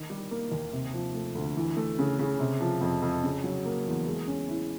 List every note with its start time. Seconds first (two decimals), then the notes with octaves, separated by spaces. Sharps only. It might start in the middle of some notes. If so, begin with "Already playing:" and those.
Already playing: D#3
0.10 G3
0.31 A#3
0.52 D#2
0.73 C3
0.94 F3
1.14 A3
1.35 D2
1.57 E3
1.77 A3
1.98 C#3
2.19 C#3
2.40 C3
2.61 F3
2.81 F2
3.02 F2
3.24 C#3
3.44 F#3
3.66 A#3
3.86 E2
4.07 G#3
4.28 C#4
4.48 E4